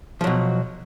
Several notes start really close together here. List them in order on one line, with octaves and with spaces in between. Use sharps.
F3 F#3 B2